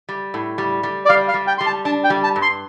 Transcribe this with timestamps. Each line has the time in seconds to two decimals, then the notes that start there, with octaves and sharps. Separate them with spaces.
0.09 G3
0.34 A2
0.58 G3
0.83 G3
1.05 D5
1.09 G3 F5
1.28 F5
1.34 G3
1.47 G5
1.58 G3 C6
1.66 A5
1.85 D4 A5
2.04 G5
2.10 G3
2.23 A5
2.36 G2
2.42 C6